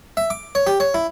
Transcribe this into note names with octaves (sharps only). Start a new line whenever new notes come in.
E5
D6
C#5
G4
C#5
E4